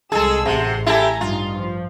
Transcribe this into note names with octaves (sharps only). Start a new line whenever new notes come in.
C2 G#3 G#4 A4 E6
A1 C3 F#5 C6
E4 G4 A4 G#5 A#5
G2 D#4 F4
F3